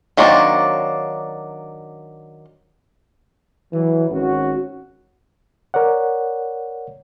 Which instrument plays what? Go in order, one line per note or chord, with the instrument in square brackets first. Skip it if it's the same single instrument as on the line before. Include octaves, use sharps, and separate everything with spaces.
[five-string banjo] D#3 F#3 A#3 C4 D4
[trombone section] E3 F#3
G#1 C#4 F#4
[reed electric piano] A#4 C#5 D5 F#5